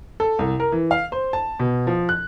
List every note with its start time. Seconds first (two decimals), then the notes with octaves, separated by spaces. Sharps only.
0.20 A4
0.39 C2
0.60 A#4
0.72 E3
0.91 F5
1.12 C5
1.33 A5
1.59 B2
1.87 F3
2.09 F#6